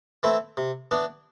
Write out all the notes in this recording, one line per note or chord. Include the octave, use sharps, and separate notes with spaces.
E3 A3 C4 E4
C3
E3 B3 D4